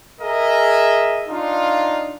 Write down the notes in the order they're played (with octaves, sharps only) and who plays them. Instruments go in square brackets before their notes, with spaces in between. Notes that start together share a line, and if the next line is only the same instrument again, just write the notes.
[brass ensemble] G#4 A#4 D#5 E5
D4 D#4 F4